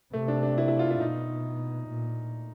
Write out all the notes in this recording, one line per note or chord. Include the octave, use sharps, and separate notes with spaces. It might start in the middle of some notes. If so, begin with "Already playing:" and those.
C3 A3
D4
D4
E4
E4
F4
E4
B2 D#4
A#2